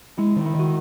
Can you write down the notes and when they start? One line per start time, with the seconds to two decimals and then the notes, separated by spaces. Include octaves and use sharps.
0.18 G#3 E4
0.36 D#3
0.46 E4
0.55 D#3 F#4